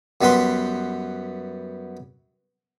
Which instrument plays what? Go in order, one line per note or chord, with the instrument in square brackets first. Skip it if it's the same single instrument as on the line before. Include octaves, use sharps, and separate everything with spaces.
[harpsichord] F#2 G3 B3 B4 C6